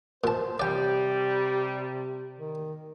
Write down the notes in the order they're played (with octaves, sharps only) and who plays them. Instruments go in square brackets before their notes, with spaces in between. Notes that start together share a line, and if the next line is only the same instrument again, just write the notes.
[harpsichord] A#2 A5 [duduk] C5
[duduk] C3 [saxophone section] G3 [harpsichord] D5 G5
[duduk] D#3